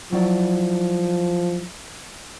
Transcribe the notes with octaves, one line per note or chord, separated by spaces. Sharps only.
F3 F#3 E4 D5